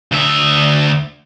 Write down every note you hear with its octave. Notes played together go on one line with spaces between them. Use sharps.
D2 E5